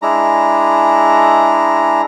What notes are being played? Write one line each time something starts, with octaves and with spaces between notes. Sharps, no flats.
G#3 D4 E4 A#5